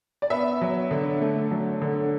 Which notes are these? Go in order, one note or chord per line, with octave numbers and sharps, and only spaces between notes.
D5
B3 E5
F#3
D3
A3
F#3
D3